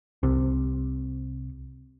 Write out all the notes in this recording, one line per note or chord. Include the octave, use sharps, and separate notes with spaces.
C2 C3